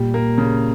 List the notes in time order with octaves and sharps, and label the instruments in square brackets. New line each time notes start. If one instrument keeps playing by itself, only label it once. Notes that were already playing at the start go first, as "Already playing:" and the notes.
Already playing: [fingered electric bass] A#2 [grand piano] G3
[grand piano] A#3
C#3